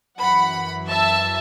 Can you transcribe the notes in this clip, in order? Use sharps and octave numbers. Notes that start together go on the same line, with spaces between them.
F#2 E3 F#5 B5
E5 A5